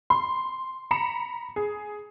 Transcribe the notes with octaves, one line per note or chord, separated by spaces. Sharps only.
C6
A#5 B5 C#7 E7
G#4